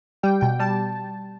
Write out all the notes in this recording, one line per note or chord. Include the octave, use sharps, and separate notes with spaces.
G3 G5
B2 G5
G3 A5